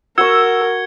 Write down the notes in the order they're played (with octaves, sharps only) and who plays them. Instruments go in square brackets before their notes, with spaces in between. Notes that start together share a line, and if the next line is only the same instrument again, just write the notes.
[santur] F#4 C#6 [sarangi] A#4 [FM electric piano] E6 [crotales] G#6 C#7 G7